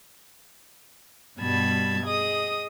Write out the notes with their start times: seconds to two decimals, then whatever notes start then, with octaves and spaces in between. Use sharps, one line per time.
1.39 G2 B2 G3 A5 B5 G#6
2.04 G#4 D#5 D#6